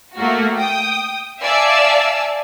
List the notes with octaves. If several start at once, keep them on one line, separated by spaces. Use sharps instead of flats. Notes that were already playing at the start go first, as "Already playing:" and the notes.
A3 A#3 F#4
G5 D#6
D5 E5 F5 G#5 A5 E6